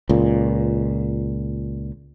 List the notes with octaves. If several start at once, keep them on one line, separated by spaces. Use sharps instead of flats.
C#2 A#2